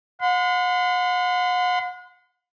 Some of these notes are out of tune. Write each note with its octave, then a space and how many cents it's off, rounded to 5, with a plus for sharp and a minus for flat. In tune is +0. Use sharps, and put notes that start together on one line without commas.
F#5 -40 C6 -40